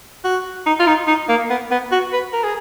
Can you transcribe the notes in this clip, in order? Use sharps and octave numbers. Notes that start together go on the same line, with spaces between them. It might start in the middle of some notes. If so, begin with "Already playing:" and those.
F#4
D#4
F4
D#4
D#4
A#3
B3
B3
F#4
B4
A#4
G#4